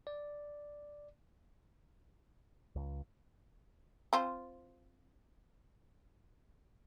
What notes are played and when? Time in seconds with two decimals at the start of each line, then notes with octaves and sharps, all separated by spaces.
0.07 D5
2.76 C#2
4.13 C4 F4 C5